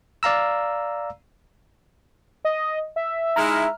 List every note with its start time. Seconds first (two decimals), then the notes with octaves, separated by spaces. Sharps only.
0.23 D5 F5 A#5 E6
2.45 D#5
2.96 E5
3.36 G#3 D#4 E4 A#5 F6